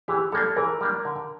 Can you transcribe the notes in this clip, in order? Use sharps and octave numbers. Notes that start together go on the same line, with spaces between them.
E3 G4
G3 A#3 D4 A4
E3 A#4
G3 A#3 D4
D3